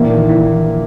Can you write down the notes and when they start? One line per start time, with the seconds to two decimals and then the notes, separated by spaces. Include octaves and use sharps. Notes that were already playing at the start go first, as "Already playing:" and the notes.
Already playing: A#1 A#2 E3 A#3 E4
0.10 D#3
0.29 E3